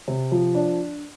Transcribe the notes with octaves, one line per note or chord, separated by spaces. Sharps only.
C3
F3
D4